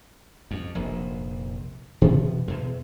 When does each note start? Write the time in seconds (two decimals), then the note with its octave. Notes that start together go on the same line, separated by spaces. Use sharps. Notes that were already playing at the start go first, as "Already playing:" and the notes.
0.51 F2
0.75 F1 A#1
2.01 B2 E3 F3 B3
2.48 E2 B2